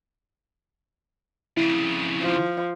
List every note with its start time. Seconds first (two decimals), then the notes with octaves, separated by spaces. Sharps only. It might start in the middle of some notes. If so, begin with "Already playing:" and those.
1.57 F2 C#3 E4
2.22 F3